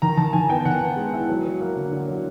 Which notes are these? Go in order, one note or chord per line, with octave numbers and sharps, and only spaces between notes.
D#3 A#5
D#3 A5
D#3 G#5
B3 G5
D#3 F#5
B3
G#3
E4
F#3
F#3
A#3
D3
D3
F#3